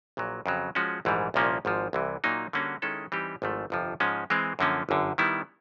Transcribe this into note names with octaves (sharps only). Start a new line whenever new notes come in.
A#1 A#2 F#3
F2 C#3 F#3
F3 G#3 C#4 F#4
A#1 G#2 E3 G3
C2 A#2 F3 A#3 C#4
G#1 G#2 F3
C2 C3 E3
A#2 F#3 A#3 D#4
D3 G3 A#3 C#4 F#4
D#3 G#3 C#4 E4 A4
E3 G3 C4 D#4 G4
G#1 G#2 F3 A3
G1 F2 C3 F3
G#2 F3 G#3 C#4
E3 G#3 C4
F#2 D3 F3 A#3 C#4
G1 F#2 D3
D#3 G3 B3 E4